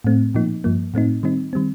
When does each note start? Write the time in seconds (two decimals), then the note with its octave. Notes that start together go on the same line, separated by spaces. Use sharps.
0.04 A2 A3 C4
0.35 A#2 F3 A#3 D#4
0.64 G2 F3 A#3
0.94 A2 A3 C4 D#4
1.23 D#3 G3 C4 D#4
1.53 D#3 G3 C4